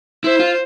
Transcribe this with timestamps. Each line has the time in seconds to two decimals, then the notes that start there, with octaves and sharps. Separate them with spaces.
0.24 E4 C5
0.40 F4